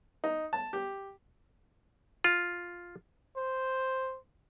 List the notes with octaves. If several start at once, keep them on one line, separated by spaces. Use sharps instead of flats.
D#4
A5
G4
F4
C5